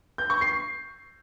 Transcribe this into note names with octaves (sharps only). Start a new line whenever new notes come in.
G6
C#6
C7